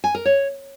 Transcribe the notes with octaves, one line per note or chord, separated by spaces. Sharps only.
G#5
A#4
C#5